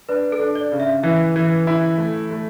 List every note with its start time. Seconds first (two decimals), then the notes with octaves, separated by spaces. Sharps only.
0.09 D4 B4
0.32 A4
0.40 D4
0.55 D5
0.72 C#3
0.80 E5
1.03 E3 E5
1.36 E3
1.67 E4
1.98 A3
2.31 A3